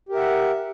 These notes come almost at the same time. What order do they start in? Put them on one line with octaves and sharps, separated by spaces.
G4 A#4 E5 F#5